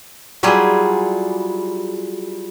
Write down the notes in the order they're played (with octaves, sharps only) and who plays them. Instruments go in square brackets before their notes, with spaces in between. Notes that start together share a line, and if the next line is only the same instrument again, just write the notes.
[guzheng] F#3 G3 E4 F4 G#4